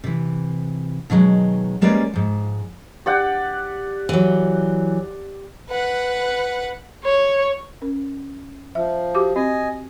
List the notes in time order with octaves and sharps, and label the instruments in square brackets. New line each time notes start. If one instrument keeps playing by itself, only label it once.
[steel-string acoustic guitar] C3 E3
B2 D#3 F#3 G#3
G3 G#3 A#3 C#4 B4 D5
G#2 F3
[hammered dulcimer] G4 D5 F#5
[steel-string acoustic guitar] E3 F#3
[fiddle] B4 F#5
[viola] C#5
[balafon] C#4 A#4
[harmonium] F3 [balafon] E5
[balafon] F#4 G4 D6
[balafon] C4 [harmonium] D#5 G#5